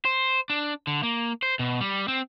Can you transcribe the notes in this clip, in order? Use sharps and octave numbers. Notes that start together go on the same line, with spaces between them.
C5
D4
D3
A#3
C5
B2
G3
C4